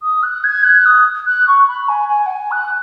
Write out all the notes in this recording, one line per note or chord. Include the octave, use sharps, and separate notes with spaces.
D#6
F#6
G#6
F#6
D#6
F#6
C#6
B5
G#5
G#5
F#5
G#5
F#6